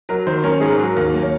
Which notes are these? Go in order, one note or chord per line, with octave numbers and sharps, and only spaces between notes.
F#3 A#4
D#3 C5
C#4 A#4
G#2 G#4
A#4
F#3
D#2 A#4
A#3
C#5